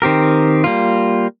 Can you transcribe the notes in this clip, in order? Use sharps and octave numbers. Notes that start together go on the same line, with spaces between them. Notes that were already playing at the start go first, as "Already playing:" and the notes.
D#3 C4 G4 A#4
G3 A#3 F4